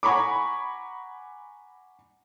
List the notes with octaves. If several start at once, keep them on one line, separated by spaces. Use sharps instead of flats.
F#5 G#5 A#5 B5 C#6 D6